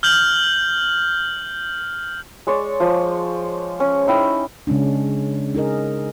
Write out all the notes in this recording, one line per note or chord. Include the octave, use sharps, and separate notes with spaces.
F6 G6 F#7
G#3 C#5 D5
F3
C#4
D#4 E4 G5
C#3 G#3 C#4 D4
D#4 G#4 A#4 D#5